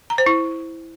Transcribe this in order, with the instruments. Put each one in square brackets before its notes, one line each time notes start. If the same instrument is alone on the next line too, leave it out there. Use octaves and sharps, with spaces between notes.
[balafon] A#5
C5
E4